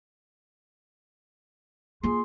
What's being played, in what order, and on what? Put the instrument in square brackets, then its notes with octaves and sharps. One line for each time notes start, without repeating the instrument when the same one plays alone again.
[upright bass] A#3 F4 [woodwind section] G#4 C6